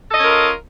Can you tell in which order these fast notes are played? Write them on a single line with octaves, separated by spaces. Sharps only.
A4 D#5 C#4 A#4 F4